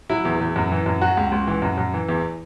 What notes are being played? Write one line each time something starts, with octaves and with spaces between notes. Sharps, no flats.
F#3 E4
E2
E2
F#2
E3
F#2
F#3 F#4
C#2
C#2
E3
F#2
F#2
E3
E2